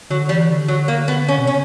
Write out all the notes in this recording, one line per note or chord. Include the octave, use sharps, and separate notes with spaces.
D3 F#3
E3 G3
D3
F#3
A#3
B3
C#4
B2
C#3 C#4